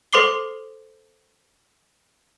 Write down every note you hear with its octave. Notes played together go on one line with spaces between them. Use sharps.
A4 C5 C6 D6 C7 G7